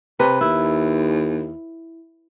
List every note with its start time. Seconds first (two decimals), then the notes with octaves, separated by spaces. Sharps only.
0.20 C3 B4
0.41 D#2 E4